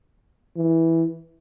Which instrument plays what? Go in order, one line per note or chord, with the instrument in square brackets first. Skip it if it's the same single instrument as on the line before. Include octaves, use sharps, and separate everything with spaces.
[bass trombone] E3